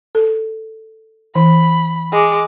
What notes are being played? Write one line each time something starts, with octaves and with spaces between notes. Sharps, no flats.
A4
E3 B5
G#3 D6